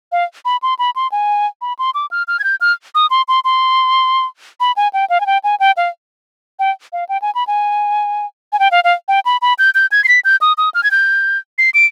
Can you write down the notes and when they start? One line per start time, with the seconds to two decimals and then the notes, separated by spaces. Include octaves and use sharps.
0.12 F5
0.45 B5
0.62 C6
0.79 B5
0.96 C6
1.12 G#5
1.62 B5
1.79 C6
1.94 D6
2.11 F6
2.28 F6
2.39 G#6
2.44 G6
2.61 F6
2.95 D#6
3.10 C6
3.28 C6
3.44 C6
4.60 B5
4.76 G#5
4.93 G5
5.10 F5
5.21 G#5
5.26 G5
5.44 G#5
5.60 G5
5.77 F5
6.59 G5
6.93 F5
7.09 G5
7.22 G#5
7.35 B5
7.47 G#5
8.53 G#5
8.59 G5
8.71 F5
8.84 F5
9.08 G5
9.25 B5
9.42 B5
9.59 G6
9.75 G6
9.92 G#6
10.04 C7
10.08 B6
10.25 G6
10.41 D#6
10.58 D#6
10.74 F6
10.83 G#6
10.91 G6
11.58 C7
11.74 D7